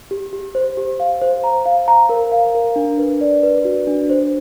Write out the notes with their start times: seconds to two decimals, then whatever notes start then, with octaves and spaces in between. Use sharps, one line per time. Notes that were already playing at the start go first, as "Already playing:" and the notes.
0.11 G4
0.33 G4
0.55 C5
0.77 G4
1.00 F5
1.22 C5
1.44 A#5
1.66 F5
1.88 A#5
2.09 A#4
2.32 F5
2.55 A#4
2.76 D4
2.98 B4
3.21 D5
3.43 B4
3.65 F#4
3.87 D4
4.10 C5